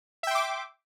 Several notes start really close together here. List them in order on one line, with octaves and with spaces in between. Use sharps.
E5 G5 C6 D6